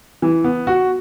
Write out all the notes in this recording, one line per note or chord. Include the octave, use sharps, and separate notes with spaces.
E3
B3
F#4